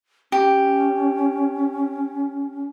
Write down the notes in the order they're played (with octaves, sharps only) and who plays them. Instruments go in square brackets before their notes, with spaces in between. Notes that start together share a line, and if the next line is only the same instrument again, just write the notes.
[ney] C#4 [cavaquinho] G4